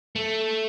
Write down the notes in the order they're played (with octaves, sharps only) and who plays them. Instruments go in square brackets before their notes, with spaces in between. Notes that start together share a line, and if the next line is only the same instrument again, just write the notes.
[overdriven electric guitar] A3